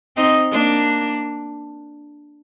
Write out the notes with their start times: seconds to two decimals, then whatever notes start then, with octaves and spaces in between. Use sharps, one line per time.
0.16 C4 D#4
0.52 A#3 D4